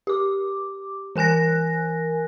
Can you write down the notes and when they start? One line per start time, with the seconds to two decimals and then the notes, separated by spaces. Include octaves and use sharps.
0.07 G4 D6
1.16 E3 A#4 G#5 F#6 A#6